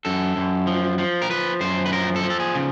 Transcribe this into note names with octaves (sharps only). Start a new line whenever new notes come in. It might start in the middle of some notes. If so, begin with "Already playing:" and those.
F#2 A4
F#2
F3
F3
A#4
F3 B4
F#2 C5
B4
F3 A#4
A4
F3
A4
G#4
C#3